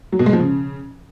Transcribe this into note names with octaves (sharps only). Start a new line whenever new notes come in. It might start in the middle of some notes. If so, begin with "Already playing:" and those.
F#3
B2
G#3
F3
C#3